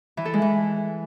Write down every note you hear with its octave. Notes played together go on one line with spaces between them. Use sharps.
E3
A4
G#3
E3